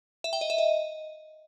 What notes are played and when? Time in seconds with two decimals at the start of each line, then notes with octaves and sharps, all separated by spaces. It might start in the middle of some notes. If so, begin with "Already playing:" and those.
0.24 E5
0.33 G5
0.41 D#5
0.50 E5
0.58 D#5